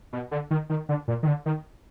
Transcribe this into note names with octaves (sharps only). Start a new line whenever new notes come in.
B2
D3
D#3
D#3
D3
A#2
D#3
D3
D#3